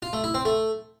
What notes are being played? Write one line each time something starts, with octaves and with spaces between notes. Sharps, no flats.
F4
A3
E4
C4
A3